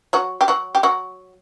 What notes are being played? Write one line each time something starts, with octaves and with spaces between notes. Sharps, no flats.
F#3 F#4
G4
F#3 F#4
G4
F#3 F#4